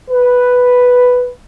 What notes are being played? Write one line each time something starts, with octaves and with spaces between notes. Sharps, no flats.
B4